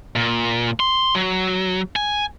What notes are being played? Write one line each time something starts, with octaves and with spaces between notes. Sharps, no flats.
A#2
C6
F#3
G#5